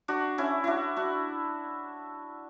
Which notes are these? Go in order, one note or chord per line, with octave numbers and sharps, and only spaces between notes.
D4 F#4
C#4 E4
D4 E4 F#4
D4 F#4